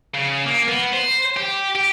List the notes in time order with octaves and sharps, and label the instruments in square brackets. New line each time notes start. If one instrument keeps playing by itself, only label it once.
[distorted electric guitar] C#3
A#3
B3
C5
G4
G4